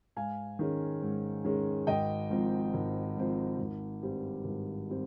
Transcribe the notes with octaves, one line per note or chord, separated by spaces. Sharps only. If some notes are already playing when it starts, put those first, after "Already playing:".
G#2 F5 G#5
D#3 G#3 C#4
G#2
D#3 G#3 C#4
G#1 D#5 G5
G#2 F3 C4
G#1
G#2 F3 C4
G#1
G2 G3 C4
G#1
G3 C4